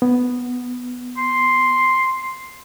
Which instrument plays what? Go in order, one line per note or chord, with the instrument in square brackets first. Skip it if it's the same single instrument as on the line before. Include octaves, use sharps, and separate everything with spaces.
[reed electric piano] B3
[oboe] C6